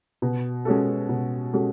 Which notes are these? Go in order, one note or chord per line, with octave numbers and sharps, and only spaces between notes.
B2
G#3 C#4 F#4 A4
B2
G#3 C#4 F#4 A4